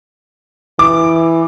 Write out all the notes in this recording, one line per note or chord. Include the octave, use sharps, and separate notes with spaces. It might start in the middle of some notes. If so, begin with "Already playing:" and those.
E3 D6